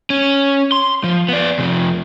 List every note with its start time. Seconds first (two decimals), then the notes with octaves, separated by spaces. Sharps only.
0.10 C#4
0.72 C6
1.04 F3
1.29 B3 D5
1.59 C3 F3